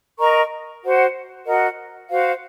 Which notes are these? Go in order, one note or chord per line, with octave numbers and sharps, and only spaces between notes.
A#4 D#5 A#5 C#6
F#4 C5 F#5
F#4 A#4 D#5 F#5
F#4 C5 F5